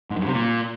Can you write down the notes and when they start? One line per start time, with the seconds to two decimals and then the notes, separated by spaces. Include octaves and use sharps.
0.10 G#2
0.16 F#2
0.22 G2
0.28 C3
0.34 A#2